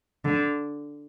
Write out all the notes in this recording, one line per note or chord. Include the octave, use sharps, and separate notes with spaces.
D3